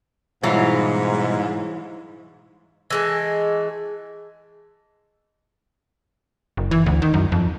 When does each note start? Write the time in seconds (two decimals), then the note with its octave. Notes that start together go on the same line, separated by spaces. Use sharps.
0.43 G#2 B2 E3 F#3 G3 E4 F4
2.90 E3 G#3 A3
6.57 F#1
6.71 E3
6.86 D2
7.02 D#3
7.14 F#2
7.32 F2